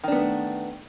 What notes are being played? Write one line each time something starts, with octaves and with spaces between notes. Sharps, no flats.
D#3 A3 B3 D4